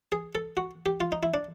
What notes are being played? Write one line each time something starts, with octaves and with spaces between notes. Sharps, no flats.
G#4
A4
F#4
G4
F4
D#4
E4
D4